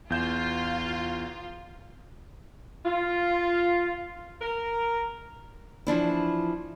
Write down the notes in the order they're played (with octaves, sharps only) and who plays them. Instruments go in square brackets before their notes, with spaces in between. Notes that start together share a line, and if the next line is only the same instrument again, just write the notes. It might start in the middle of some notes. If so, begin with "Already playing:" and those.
[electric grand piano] E2 G6 E7 [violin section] F4
[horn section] F4
A#4
[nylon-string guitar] E3 F3 D4 E4